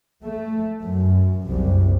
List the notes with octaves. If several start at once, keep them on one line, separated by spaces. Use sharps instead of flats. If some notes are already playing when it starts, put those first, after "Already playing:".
A3
F#2
F#1 C2 F#2